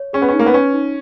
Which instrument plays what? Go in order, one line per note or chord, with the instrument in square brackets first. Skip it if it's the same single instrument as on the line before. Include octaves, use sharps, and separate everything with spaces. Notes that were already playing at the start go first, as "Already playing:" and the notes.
Already playing: [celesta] C#5
[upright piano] C#4 [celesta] G#4
[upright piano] B3
[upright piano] C#4 [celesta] D#4
[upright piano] A#3
B3
[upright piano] C#4 [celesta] B4
[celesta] D#4